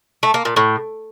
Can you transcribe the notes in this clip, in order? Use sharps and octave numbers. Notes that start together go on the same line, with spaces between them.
A3
A#3
A#2
A2